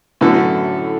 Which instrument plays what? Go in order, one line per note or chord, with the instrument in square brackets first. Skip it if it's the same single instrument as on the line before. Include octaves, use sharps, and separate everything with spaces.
[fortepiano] F#2 D3 B3 F#4 A4 [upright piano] A2